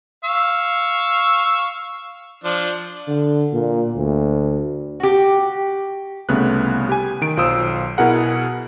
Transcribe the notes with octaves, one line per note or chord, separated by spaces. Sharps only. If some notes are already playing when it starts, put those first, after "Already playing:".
F5 C#6 E6
F3 D4
D3
A#2
D2
F#4 G4
C2 C#3 A3 B3 F#6
G4 G#5
D#3 D7
B1 F4 C5 D#6 E6
B2 E4 G#4 A#4 F#5